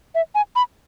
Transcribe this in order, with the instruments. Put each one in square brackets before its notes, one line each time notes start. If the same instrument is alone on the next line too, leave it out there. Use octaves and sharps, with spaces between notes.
[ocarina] E5
G#5
B5